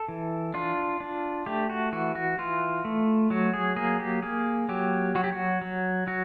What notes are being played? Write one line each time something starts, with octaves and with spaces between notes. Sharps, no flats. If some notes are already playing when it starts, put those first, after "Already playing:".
Already playing: A4
E3
D4 F4
D4
A3 G4
F#4
E3 F#4
F#4
E3 F4
A3
F#3 F#4
G#4
A#3 G#4
G4
A#3 G#4
F#3 G4
F#3 F#4
G4
F#4
F#3
F#3 F#4